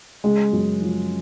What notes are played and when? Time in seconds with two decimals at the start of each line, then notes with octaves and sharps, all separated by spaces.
0.24 C#3 G#3
0.53 F#2
0.82 F3